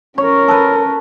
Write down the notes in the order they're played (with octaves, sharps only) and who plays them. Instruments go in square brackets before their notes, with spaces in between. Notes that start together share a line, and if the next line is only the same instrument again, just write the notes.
[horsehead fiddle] C#4 A#4 [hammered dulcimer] C#5
[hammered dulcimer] A4 B4